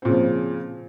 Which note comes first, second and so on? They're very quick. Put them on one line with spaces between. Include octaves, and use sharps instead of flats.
C4 A#2 C#3 F3